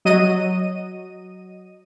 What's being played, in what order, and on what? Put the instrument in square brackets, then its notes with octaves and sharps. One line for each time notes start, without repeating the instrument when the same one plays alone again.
[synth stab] F#3 D#5 D#7